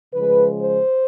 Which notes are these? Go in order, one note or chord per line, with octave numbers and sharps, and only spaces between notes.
C#3 F3 G#3 B4
C5